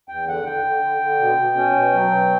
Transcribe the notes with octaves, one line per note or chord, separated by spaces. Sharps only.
E2 G5
D3 F#5
D3 G5
D3
D3
D3
B2
B2
C#4
B2
F#3
B2